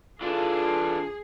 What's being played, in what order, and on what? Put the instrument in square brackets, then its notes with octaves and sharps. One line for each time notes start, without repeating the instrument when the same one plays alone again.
[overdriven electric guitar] E3 D4 [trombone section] F4 [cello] G#4 [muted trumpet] A4